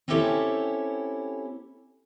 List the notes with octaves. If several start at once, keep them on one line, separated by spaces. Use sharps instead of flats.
C4 C#4 E4 G4 A4 C#5